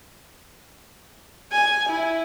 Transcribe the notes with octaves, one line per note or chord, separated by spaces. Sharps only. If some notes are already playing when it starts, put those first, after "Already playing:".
G#5
E4